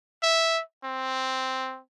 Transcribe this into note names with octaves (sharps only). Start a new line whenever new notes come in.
E5
C4